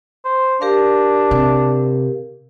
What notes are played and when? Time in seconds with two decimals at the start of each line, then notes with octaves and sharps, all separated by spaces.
0.25 C5
0.61 D4 G4 A#4 F5
1.31 C3